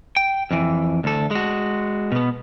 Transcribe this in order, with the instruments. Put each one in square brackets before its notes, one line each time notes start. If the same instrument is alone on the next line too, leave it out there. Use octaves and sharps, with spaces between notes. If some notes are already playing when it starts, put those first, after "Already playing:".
[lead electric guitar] G5
F2 E3
D2 A4
G#3 F#4
B2 B3